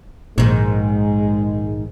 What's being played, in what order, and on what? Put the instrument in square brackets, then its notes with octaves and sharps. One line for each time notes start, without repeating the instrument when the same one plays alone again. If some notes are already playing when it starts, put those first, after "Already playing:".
[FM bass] A#1 [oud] G#2 D#3 [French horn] G#3